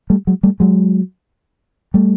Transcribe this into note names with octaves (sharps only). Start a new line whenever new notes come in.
G3 A3
F#3 G#3
G3 A3
F#3 G#3
G3 A3